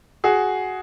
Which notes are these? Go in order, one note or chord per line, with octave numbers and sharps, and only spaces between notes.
F#4 G#4